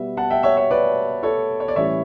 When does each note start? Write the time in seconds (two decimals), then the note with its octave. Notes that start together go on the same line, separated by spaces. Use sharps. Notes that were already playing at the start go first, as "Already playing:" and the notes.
Already playing: B2 G3 B3 E5
0.17 F#5 A5
0.30 E5 G5
0.43 C#5 E5
0.57 C#5 E5
0.71 B4 D5
1.23 A4 C#5
1.60 C#5
1.68 D5
1.76 A2 E3 G3 C#4 E4 C#5 E5